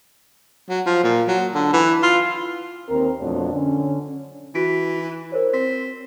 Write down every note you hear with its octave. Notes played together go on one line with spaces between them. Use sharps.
F#3
F3
A#2
F#3
D3
E3
F4
D#2 C4 A#4
F2 B2 F#3 A3 D4 C#5
D3 C#4
E3 F#4 B6 D7
E4
A#4 C5 C#5
C4 B6